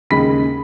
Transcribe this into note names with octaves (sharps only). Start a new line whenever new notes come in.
D#2 C#3 G#3 B5 B6